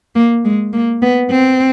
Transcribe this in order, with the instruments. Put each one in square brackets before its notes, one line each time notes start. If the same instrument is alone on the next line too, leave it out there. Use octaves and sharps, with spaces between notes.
[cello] A#3
G#3
A#3
B3
C4